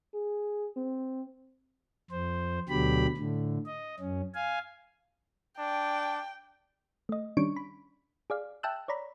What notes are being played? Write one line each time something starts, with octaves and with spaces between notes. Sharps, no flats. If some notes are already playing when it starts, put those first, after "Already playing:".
G#4
C4
F2 C5
D2 B2 D3 F#3 G4 B5
A2 D3
D#5
F#2 C#4
F5 G#5
D4 G5
A3 D#5
D#3 G3 C#4 D4 C#6 D7
B5
G#4 D5 F5
E5 G5 A5 E6 F#6
C#5 D5 A#5 B5